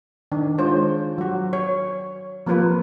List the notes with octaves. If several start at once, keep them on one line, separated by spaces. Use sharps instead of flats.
D#3 D4
G#3 D4 F4 C5 C#5
F#3 F#4
C#5
F3 A#3 C4 F4 B4